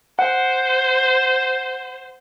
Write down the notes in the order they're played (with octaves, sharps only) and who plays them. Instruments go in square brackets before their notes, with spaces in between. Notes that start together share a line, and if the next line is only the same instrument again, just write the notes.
[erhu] C5 [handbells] F#5